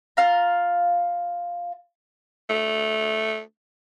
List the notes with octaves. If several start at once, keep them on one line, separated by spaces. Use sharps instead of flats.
F4 F5 A#5
A3